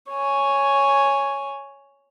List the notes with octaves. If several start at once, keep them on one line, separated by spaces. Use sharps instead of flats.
C#5 G#5